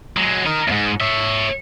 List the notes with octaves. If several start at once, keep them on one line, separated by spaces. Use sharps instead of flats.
F#3 G#3
D#4 A#4
E2 G#2
C#5 E5